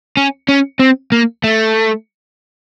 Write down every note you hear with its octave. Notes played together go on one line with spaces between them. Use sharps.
C#4
C#4
C4
A#3
A3